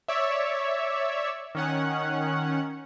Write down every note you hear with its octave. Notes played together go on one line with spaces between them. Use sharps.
C#5 D5 E5
D#3 C#4 F#5